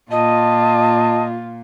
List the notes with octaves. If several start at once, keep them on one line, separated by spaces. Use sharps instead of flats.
A#2 F4 D#5 A5